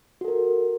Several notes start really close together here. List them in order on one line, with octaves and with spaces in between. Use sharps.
F#4 A4 A#4